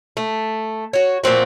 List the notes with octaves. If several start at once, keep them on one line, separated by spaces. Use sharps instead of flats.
A3
F#4 C#5
A#2 F3 C4 F#4